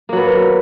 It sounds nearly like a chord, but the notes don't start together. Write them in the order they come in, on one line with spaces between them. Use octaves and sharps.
A#3 F#3 B3